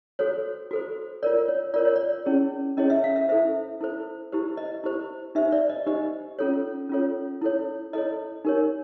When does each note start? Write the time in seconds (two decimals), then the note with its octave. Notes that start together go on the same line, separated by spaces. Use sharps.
0.19 F#4 A4 C5 C#5
0.71 F#4 A4 C5
1.23 F4 A#4 C#5 D5
1.48 C#5
1.74 F4 A#4 C#5 D5
1.85 C#5
1.96 D5
2.26 C#4 E4 G#4 C#5
2.77 C#4 E4 G#4 C#5 D#5
2.90 E5
3.04 F5
3.16 E5
3.29 E4 A4 C5 E5
3.81 E4 A4 C5
4.32 E4 G4 C5
4.57 D#5
4.84 E4 G4 C5
5.35 D#4 G4 C5 E5
5.52 D5
5.70 D#5
5.87 D#4 G4 C5 D#5
6.39 C#4 F4 A4 C#5
6.90 C#4 F4 A4 C#5
7.42 E4 A4 C#5
7.93 E4 A4 C#5 D#5
8.45 D#4 G4 A#4 C#5